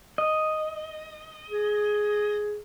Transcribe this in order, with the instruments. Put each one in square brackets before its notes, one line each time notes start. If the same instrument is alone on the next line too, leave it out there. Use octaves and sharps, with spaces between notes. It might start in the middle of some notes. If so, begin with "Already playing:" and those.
[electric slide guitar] D#5
[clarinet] G#4